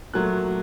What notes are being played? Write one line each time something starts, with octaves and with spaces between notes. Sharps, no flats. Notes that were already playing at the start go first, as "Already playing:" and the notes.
A#2 F#3 A3 F#6